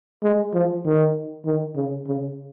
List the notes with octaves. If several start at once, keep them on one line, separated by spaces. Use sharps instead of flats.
G#3
F3
D#3
D#3
C#3
C#3